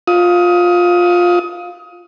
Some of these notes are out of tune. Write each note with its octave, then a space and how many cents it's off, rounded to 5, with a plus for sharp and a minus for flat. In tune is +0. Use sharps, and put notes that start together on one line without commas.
F4 +15 D#6 +20